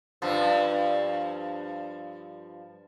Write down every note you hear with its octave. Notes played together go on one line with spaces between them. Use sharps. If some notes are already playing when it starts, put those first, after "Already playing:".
G2 F3